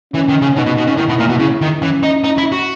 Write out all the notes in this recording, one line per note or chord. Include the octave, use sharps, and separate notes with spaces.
E3 C#4
D#3
C#3
B2 D#4
B2
B2
C#3
D#3 E4
B2
A#2
B2
C#3 E4
D#3
E3 C#4
D#4
D#4
E4
F#4